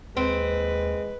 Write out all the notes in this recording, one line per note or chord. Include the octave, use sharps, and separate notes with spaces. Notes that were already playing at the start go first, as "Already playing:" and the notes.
D#2 G#3 C4 B4